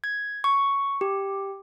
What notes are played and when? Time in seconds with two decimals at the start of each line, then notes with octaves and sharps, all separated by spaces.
0.04 G#6
0.44 C#6
1.01 G4